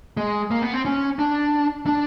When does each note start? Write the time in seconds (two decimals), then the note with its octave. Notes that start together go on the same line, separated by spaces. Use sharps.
0.17 G#3
0.51 A#3
0.62 B3
0.73 C4
0.85 C#4
1.19 D4
1.86 D4